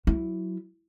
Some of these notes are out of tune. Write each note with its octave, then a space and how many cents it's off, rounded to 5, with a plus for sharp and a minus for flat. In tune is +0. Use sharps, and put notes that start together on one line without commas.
F#3 +0 E4 +0